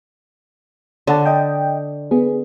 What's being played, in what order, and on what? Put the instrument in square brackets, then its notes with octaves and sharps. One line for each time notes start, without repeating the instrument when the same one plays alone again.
[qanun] D3 [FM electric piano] C#5 F#5 A5
[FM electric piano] D#5 G5
B3 G#4